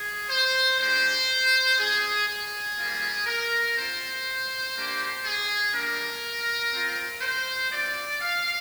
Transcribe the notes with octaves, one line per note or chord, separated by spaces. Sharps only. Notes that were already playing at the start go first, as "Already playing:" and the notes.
Already playing: G#4
C5
G#3 D4 G4 C5
C4 F4 G#4
G#4
G3 A#3 F4
A#4
C4 F4 C5
A#3 D4 G4
G#4
G3 A#3 D4 A#4
C4 F4
C5
C4 F4 D5
F5